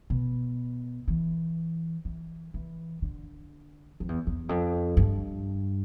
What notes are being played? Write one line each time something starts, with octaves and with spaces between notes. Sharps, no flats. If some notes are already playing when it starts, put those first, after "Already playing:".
B2
E3
E3
E3
D3
F2
E2
E2
F2
G2